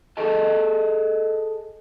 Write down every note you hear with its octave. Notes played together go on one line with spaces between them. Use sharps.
G#4 A4 D#5 A5